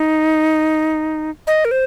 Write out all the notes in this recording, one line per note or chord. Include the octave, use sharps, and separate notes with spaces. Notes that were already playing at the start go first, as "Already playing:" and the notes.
Already playing: D#4
D#5
A#4
C5